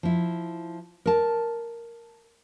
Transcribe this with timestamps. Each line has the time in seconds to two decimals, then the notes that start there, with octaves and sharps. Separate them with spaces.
0.03 F3 E4
1.06 A#4 A5